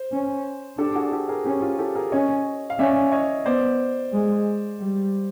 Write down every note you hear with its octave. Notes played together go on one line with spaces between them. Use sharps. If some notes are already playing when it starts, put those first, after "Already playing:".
Already playing: C5
C#4
D4 G4 A4
F#4 G#4
G4 A4
G#4 A#4
C#4 G4 A4
F4 G4
G4 A4
G#4 A#4
C#4 C#5 D#5
F5
C#4 D5 E5
C#5 D#5
B3 C5 D5
G#3
G3